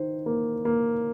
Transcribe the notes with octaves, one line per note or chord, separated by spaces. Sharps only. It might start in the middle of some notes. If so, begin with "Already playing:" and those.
Already playing: D#3 C5
A#3
A#3